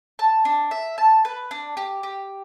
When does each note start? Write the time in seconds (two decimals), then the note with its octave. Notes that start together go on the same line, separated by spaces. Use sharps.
0.19 A5
0.45 D4
0.71 E5
0.98 A5
1.25 B4
1.51 D4
1.77 G4
2.03 G4